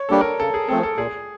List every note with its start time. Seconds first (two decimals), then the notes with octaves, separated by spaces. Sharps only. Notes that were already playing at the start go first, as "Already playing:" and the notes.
Already playing: C#5
0.09 G3 A#3 D4 G4 A4
0.21 A#4
0.40 C#3 A4
0.54 G#4
0.69 F3 A3 C4 A4
0.83 A4
0.97 A#2 G#4